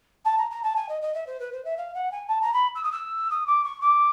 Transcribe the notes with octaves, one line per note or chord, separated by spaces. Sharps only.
A5
A#5
A#5
A5
G#5
D#5
D#5
E5
C5
B4
C5
E5
F5
F#5
G#5
A5
A#5
B5
E6
D#6
E6
D#6
D6
C#6
D6